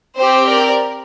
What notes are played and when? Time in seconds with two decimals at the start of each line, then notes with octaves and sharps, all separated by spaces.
0.17 C4 G4 C5
0.48 A#4 D5